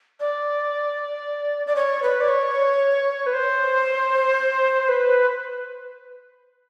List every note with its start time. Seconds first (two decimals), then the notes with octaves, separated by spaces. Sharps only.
0.20 D5
1.66 D5
1.76 C#5
2.03 B4
2.20 D5
2.28 C#5
3.26 B4
3.33 C5
4.88 B4